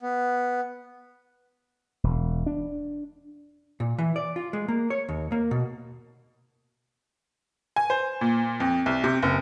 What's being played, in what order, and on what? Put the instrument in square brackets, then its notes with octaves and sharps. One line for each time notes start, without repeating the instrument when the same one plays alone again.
[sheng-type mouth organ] B3
[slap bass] E1
D4
[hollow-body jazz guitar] A#2
E3
D5
F4
G#3
A#3
C#5
D#2
A#3
B2
[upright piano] G#5
C5
A#2
F2
C2
C3
F#1